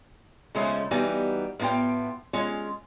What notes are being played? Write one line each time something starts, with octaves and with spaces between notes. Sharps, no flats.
C#3 F3 G#3 A3 C#4
E3 G3 B3 D#4 F#4 G#5
A2 B3 D#4 F4 G5
G#3 C#4 F4